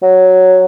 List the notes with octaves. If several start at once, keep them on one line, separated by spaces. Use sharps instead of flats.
F#3